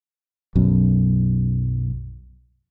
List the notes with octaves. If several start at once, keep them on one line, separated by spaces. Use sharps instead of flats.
B1 F#2